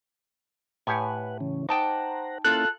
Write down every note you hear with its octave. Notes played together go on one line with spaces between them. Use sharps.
A2 G4 B4 C#5 F#5 G#5
C#3 E3 C#4
D#4 C5 F#5 G5 A5 A#5 D6
A#3 C#4 E4 F4 A4 F#6